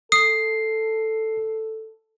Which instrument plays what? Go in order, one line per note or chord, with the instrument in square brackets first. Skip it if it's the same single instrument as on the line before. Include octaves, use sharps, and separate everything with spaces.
[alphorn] A4 [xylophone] D#6 [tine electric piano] C7